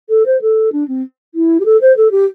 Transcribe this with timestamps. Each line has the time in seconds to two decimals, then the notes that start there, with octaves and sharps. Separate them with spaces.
0.09 A4
0.26 C5
0.41 A4
0.72 D4
0.88 C4
1.35 E4
1.60 G4
1.65 A4
1.81 C5
1.97 A4
2.11 G4